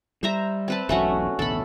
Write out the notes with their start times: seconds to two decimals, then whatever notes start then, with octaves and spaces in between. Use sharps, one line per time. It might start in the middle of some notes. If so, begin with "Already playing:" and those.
0.23 G3 C5 E5 A#5
0.68 C4 B4 A5
0.89 E1 B1 A3 C#4 F#4
1.39 A1 D2 B2 A4 B5